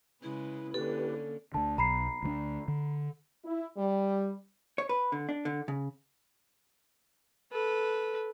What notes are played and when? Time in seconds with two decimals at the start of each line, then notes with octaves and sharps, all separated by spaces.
0.23 C#3 G#3 E4 B4
0.74 D3 A#3 C#4 G4 A4 B4
1.54 D2 D3 A5
1.78 B1 A#5 B5 C7
2.23 D2 E3 D4
2.68 D3
3.44 E4
3.78 G3
4.78 C#5
4.89 B4
5.12 D3
5.29 D4
5.45 D3
5.68 C#3
7.52 A4 B4